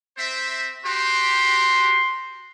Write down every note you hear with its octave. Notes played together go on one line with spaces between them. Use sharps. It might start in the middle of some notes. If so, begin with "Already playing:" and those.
C4 C5 E5
F#4 G4 C6